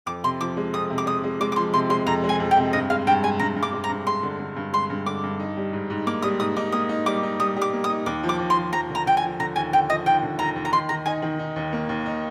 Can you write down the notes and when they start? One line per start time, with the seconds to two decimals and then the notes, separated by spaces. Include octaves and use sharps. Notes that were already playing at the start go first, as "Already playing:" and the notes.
0.06 F2 D6
0.24 C3 C6
0.41 F3 D6
0.57 G#3
0.73 F2 D#6
0.90 C3
0.98 D6
1.06 G#3 D#6
1.24 G#3
1.41 G#3 D6
1.52 D6
1.56 F3 C6
1.73 C3 C6
1.90 G#3 C6
2.07 F2 A#5
2.24 G#3
2.29 G#5
2.40 F2
2.51 G5
2.57 C3
2.73 G2 D#5
2.90 G#3 F5
3.07 G2 G5
3.23 G#3 G#5
3.40 G2 A#5
3.56 G2
3.63 D6
3.73 G#3
3.84 A#5
3.89 G2
4.07 G#3 C6
4.23 D3
4.40 D3
4.56 G2
4.73 G#3 C6
4.90 G2
5.06 D3 D6
5.24 G2
5.40 D#4
5.57 G3
5.73 G#2
5.90 G#2
6.06 A#3 D6
6.22 G3 D#6
6.40 G#2 D#6
6.56 D#4 D6
6.72 A#3 D#6
6.89 D#4
7.06 G3 D6
7.23 D#4
7.39 G3 D#6
7.56 G3
7.62 D6
7.73 A#3
7.84 D#6
7.89 D#4
8.06 D#2 D6
8.23 F3
8.29 D6
8.39 D#2
8.50 C6
8.57 F3
8.73 F3 A#5
8.90 D3
8.95 A#5
9.06 D3 G5
9.17 G#5
9.23 F3
9.39 D3 A#5
9.56 D#2 G#5
9.73 D3 G5
9.90 F3 D#5
10.06 D#2 G5
10.23 D3
10.39 D#2 A#5
10.56 D#2
10.65 A#5
10.72 D#3 C6
10.89 D#3 A#5
11.06 D#4 G#5
11.22 D#3
11.39 D#4
11.56 D#2
11.73 A#3
11.89 D#2
12.06 D#4